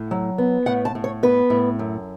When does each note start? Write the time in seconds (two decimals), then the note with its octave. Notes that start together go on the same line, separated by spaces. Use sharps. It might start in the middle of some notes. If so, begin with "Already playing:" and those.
Already playing: A2
0.11 F#3
0.38 B3
0.66 A2 F#5
0.85 A5
0.95 A2
1.04 C#5
1.23 B3 B4
1.50 A2
1.79 F#2